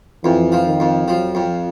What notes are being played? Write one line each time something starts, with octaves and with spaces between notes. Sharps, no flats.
F2 E3
F3
D#3
F2
F3 F#3
F2